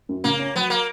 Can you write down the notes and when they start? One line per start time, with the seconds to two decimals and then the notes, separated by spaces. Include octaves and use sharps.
0.09 F#2
0.24 C#3 A#3
0.39 C#4
0.55 F#3 B3
0.70 A#3